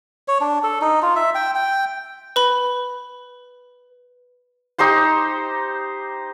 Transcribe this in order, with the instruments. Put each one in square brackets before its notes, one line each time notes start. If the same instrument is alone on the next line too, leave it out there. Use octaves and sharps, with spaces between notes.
[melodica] C#5
D4
A4
D#4
F4
E5
G5
G5
[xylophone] B4 B5
[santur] D#4 G4 C5 C6